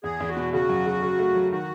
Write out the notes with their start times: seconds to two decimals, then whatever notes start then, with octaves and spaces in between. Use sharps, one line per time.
0.04 E2 G#4
0.20 E2
0.29 F#4
0.37 B2
0.53 C#3 F#4
0.70 F#2
0.86 C#3
1.02 C#3
1.19 A3
1.35 F#3
1.52 D#3 F#4